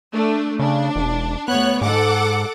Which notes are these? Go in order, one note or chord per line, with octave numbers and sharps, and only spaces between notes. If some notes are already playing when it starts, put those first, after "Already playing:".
A3 D4
C#3 D4
E1
D2 B3 C#5 F#6
G#2 A4 F#5 D6